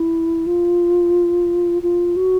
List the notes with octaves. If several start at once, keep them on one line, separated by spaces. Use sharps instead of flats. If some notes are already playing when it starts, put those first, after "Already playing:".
Already playing: E4
F4
F4
F#4